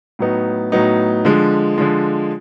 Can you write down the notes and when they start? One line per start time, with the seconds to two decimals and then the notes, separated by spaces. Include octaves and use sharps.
0.19 A2 F#3 B3 D#4
0.72 A2 F#3 B3 D#4
1.25 D3 F3 G#3
1.78 D3 F3 G#3